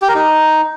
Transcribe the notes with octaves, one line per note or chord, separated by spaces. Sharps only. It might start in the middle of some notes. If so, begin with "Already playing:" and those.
G4
A#4
D#4